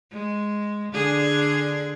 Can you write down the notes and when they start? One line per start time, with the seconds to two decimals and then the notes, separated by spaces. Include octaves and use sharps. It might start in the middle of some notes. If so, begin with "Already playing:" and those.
0.12 G#3
0.93 D3 D4 G#4